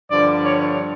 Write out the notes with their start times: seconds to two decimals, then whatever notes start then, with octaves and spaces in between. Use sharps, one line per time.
0.11 G2 D3 F3 D5
0.42 C#5